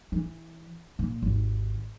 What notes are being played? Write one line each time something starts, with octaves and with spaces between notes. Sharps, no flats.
E3
A#2
G#1 D#2